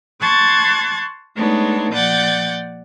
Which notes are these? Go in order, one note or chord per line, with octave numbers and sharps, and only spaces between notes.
A5 C6 C#6 F#6 G#6 A6
G#3 A3 B3 D4 D#4 C#5
A#2 F3 D5 F#5 G6 A6